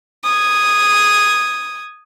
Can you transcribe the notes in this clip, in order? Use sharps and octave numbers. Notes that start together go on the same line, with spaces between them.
D#6 G#6